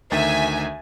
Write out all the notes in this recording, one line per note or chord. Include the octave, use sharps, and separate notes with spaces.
D2 D#3 E5 G#5 A6